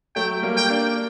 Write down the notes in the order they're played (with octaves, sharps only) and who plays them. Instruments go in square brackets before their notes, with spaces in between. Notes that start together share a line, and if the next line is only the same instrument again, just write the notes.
[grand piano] F#3 A3 [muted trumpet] G5
[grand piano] G3 A#3
[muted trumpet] G5
[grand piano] A#3 D4